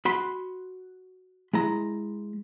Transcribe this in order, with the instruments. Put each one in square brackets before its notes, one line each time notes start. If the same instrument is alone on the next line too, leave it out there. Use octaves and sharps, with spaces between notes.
[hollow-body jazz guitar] F#4 B5 C6
G#3 E4 A#5